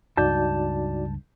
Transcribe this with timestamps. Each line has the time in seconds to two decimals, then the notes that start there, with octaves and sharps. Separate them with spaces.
0.17 C#2 G2 D#4 F#4 D5 A5 G6